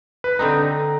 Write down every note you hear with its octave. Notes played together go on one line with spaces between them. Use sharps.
B4
D3 C4 D#4 A#5